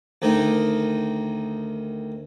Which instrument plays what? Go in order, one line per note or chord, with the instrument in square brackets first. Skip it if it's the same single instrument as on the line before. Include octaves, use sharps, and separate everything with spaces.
[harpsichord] D2 D#3 D#4